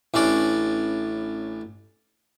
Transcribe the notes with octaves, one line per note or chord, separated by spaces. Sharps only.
A1 A2 C#4 D4 D5